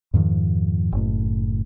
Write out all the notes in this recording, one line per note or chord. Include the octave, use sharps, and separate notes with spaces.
F2 G#2 D#3 F3
F#1 A2